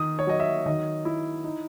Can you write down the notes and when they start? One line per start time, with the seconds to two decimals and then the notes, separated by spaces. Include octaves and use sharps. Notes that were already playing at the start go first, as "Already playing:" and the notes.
Already playing: D#3 D#6
0.19 C#5
0.27 F#3 D#5
0.40 E5
0.66 D#3 D#5
1.05 E4
1.44 D#4